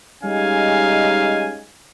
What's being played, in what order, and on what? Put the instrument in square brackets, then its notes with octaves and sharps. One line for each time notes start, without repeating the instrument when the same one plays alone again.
[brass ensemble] G3 G#3 C#4 D#4 F5 G#5